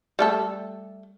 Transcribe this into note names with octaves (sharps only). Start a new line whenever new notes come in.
G3 A3 A4